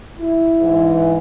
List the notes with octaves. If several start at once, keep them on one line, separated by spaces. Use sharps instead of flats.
E4
G#2 E3